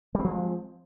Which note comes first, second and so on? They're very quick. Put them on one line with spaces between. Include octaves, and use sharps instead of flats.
G3 C4 F3 G#3